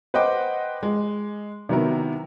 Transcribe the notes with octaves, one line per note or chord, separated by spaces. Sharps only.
B4 C5 D#5 F#5 G5 D6
G#3
C3 D#3 F#3 B3 E4 A#4